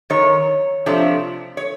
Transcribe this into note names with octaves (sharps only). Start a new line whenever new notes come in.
F#2 D#3 C#5
C3 F3 A3 D4
C#5